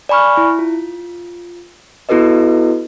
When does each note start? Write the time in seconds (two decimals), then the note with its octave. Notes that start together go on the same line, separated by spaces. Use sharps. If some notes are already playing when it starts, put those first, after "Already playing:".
0.09 D5 G#5 B5 C#6 F6
0.37 E4
0.59 F4
2.09 B3 E4 F#4 A4 B4 D#5